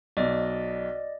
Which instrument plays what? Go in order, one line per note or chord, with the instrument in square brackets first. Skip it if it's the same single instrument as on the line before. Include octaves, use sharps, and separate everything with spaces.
[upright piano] B1 B2 [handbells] D5 D#5